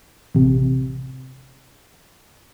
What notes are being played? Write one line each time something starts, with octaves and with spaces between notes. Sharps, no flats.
A1 C3